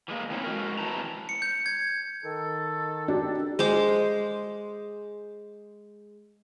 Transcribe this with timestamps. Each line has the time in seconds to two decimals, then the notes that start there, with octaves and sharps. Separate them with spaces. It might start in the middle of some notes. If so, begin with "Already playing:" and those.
0.08 E3 G#3 A#3
0.31 E3 C4 D#4 E4 C#5
0.44 G#3 F#4 A#4
0.79 E2 C3 E3 E4 A5 A#5
1.29 C#7
1.42 G6
1.66 G#6
2.24 D#3 A4
3.08 D4 F#4 G4
3.59 G#3 C5 D6